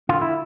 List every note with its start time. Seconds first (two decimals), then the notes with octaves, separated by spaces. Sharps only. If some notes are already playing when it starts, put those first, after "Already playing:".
0.09 D3 F4
0.21 E4